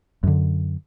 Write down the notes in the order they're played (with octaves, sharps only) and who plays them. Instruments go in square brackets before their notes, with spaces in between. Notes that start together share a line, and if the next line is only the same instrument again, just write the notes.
[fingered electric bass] F#2 D3